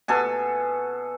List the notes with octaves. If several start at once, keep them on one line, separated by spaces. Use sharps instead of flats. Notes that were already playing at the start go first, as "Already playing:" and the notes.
B2 A4 G#5